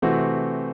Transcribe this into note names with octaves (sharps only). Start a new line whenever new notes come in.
C3 E3 A3 C4 F#4